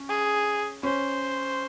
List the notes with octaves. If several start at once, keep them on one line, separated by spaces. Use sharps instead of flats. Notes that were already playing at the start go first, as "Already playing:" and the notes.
Already playing: C#4
G#4
C#4 C5